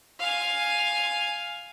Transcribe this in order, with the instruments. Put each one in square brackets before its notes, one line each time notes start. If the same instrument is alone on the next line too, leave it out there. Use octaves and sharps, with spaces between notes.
[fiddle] F5 G#5